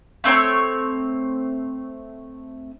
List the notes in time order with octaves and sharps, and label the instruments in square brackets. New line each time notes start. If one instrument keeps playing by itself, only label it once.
[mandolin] A3 C4 C#5 C#6